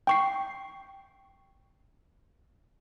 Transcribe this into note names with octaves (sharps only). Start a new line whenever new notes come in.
G5 C#6 C7